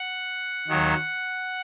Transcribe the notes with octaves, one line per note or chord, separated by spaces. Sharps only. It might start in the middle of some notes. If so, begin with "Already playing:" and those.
Already playing: F#5
D#2 D#3 F#3